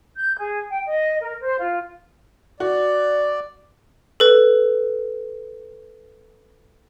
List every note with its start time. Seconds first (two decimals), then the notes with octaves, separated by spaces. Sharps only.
0.16 G6
0.38 G#4
0.68 G5
0.86 D#5
1.20 A#4
1.41 C5
1.58 F4
2.60 F#4 D5
4.20 A4 B4